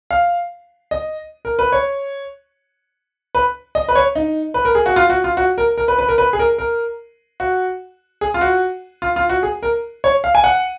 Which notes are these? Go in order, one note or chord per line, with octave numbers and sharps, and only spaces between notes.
F5
D#5
A#4
B4
C#5
B4
D#5
B4
C#5
D#4
B4
A#4
G#4
F#4
F4
F#4
F4
F#4
A#4
A#4
B4
B4
A#4
B4
G#4
A#4
A#4
F#4
G#4
F4
F#4
F4
F4
F#4
G#4
A#4
C#5
F5
G#5
F#5